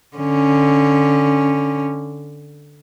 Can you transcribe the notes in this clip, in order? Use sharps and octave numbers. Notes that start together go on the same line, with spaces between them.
D3 C#4